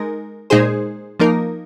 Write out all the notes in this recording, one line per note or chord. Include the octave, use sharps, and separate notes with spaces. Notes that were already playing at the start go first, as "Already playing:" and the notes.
Already playing: G#3 D#4 A#4
A#2 G#3 D#4 G#4 C5
F3 A#3 D#4 A#4